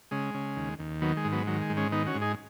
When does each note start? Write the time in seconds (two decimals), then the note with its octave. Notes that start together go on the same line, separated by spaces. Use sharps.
0.11 C#3 G#3
0.34 C#3
0.56 D#2
0.79 D#2
1.01 D#3 F#3 B3
1.17 G#3
1.25 G#2
1.32 F#3 B3
1.47 D#3 F#3
1.62 G#3
1.69 G#2
1.77 G#3 C#4
1.92 D#3 B3 D#4
2.06 C#4 F#4
2.15 G#2
2.21 D#4 G#4